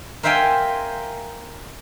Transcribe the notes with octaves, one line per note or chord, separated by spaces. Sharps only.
A#4 C5 E5 F5 G5 G#5